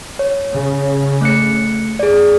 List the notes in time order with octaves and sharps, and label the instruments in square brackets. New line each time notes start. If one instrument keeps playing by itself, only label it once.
[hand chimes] C#5
[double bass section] C#3
[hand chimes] A3 F#6 C#7
[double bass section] F#2 [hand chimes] G#4 D5